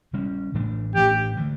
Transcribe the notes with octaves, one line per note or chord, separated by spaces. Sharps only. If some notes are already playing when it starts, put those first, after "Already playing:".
C#3 G3 C#4
A2 E3 A3 D4
A2 E3 A3 D4 G4
D3 A3